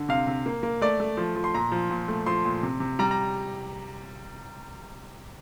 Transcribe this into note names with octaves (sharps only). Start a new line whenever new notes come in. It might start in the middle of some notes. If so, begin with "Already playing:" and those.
Already playing: D3
C3 F5
C3
A#3
A#3
A3 D5
A3
F3
F3
C6
A#2 A#5
F3
A#2
A3
F3 C6
A#2
C3
C3
G3 A#5
A#5